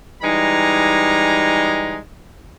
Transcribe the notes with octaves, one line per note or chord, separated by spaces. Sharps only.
E3 G3 G#3 D#4 A#5